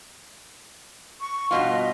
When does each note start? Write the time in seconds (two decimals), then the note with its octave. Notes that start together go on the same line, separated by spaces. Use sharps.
1.20 C#6
1.51 G2 B2 F4 D#5